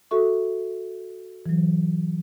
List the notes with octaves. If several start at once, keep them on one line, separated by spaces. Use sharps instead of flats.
F#4 A4 E5 C#6
E3 F#3